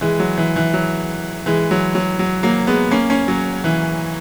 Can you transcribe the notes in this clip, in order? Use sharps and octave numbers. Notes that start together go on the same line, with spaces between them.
E3 G#3
F#3
E3
E3
F#3
E3 G#3
F#3
F#3
F#3
F#3 A#3
G#3 B3
A#3 C#4
A#3 C#4
F#3
E3